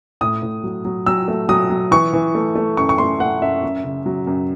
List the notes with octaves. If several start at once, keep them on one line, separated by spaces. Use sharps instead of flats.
A2 D#6
A2
F#3
F#3
F#3 E6
A3
F#3 D#6
F#3
E3 C#6
E3
A3
A3
F#2 C#6
C#6
A3 C6
A3 F#5
F#2 E5
F#2
C#3
F#3
F#2